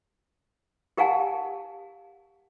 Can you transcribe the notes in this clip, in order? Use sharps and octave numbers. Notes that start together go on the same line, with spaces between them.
G4 A#4 F5 F#5 G#5 A5